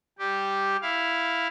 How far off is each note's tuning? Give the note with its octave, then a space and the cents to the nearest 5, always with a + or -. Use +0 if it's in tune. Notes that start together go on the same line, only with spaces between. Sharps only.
G3 +0 G4 +0
E4 +0 F5 +0